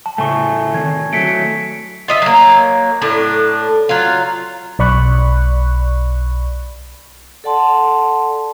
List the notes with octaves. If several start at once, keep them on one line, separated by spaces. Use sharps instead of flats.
A5
A2 C#3 A3 G#5 C#6
D#3 C4 G#6
F#3 A3 B6 C#7 D7
F4 D#5 E5
F#3 A#3
A2 D4
F#3 F4
B1 D5 B5 C#6 F#6
A4 D5 F#5 A5 C6